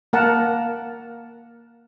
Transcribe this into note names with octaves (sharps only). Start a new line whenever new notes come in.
A#3 A#4 F#5 A5